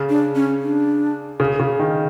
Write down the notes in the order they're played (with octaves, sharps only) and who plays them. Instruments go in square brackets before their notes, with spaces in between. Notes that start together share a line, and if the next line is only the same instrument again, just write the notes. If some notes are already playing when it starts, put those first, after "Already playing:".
Already playing: [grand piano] C#3
[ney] D4
C#4
D4
[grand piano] C#3
C#3
D#3